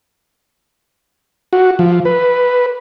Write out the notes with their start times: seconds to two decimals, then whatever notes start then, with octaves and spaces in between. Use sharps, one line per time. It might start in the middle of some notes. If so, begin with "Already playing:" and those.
1.53 F#4
1.79 F3
2.05 B4